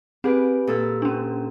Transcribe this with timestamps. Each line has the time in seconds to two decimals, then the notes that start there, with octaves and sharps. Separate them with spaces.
0.24 C4 G4 G#4 B4
0.67 A#2 A4 E6
1.02 C#4 D4